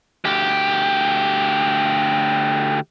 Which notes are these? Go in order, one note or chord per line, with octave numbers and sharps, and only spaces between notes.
D2 G4